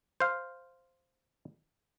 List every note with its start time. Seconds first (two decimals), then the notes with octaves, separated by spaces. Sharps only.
0.20 C5 F5